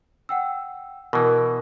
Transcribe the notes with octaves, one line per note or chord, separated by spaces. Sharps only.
F#5 G5 E6
B2 E3 A#4